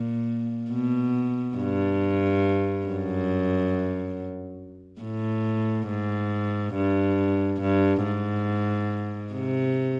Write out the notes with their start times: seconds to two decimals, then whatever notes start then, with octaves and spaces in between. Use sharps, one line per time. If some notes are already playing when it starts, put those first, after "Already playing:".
Already playing: A#2
0.71 B2
1.57 G2
2.87 F#2
5.02 A2
5.89 G#2
6.75 G2
7.61 G2
8.04 G#2
9.34 C3